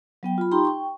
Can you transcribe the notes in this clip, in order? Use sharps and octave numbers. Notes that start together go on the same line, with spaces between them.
F#3 B3 G5
F4 B5
D#4 G4 G5 A#5 C6
G5 C#6